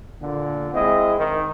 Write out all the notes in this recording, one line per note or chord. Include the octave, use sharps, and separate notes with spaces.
A#2 D3
G#3 C4 E4 D#5
D#3